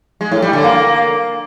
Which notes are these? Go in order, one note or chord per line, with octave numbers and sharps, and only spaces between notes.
G#3
A2
G3
D3
A#3